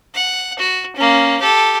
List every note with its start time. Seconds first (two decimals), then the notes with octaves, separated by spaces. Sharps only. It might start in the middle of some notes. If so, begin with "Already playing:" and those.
0.14 F#5
0.59 F#4
0.96 A#3 C#4
1.40 G4 A4